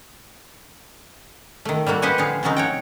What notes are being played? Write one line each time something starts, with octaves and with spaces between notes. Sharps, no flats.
D#3 A3
G3 A3 A#3 F#4
G4 B4 C5 D#5 F#5 G#5
A2 D3 F3 G#4 F5
C3 F3 F#3 C4 C#4 D#4
C#5 F#5 G5